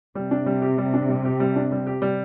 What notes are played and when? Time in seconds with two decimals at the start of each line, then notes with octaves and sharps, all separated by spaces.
0.15 C3 G3
0.31 D4
0.46 G3
0.62 G4
0.78 G3
0.94 D4
1.09 G3
1.25 G4
1.40 G3
1.56 D4
1.72 G3
1.87 G4
2.02 G3